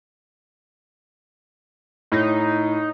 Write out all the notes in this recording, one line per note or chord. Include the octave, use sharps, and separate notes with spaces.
A2 D#4